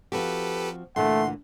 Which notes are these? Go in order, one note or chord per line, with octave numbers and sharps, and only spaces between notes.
F3 C4 F#4 G4 A4 B4
D2 A#2 E3 A3 F#5 C6